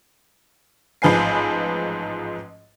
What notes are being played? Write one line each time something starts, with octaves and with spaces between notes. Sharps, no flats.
A1 G#2 F3 B4 G#5 C7